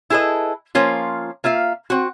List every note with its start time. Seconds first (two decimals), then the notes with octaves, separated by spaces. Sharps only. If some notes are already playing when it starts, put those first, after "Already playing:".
0.10 E4 G#4 A4 B4 D#5
0.75 F3 A#3 C#4 F4
1.44 A#3 F4 E5 F5
1.90 C4 F#4